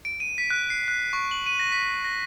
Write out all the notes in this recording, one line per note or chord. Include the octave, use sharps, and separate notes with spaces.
D7
D#7
B6
F#6
C7
F#6
C#6
F#7
D#7
A#6
B6
A#6